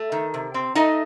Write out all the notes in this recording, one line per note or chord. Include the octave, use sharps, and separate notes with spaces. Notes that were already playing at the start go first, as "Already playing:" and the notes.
Already playing: A3
D#3
C3
C4
A3 D#4 D#5